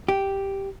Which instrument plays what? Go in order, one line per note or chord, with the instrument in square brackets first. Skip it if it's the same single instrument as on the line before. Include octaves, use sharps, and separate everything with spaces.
[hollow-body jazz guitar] G4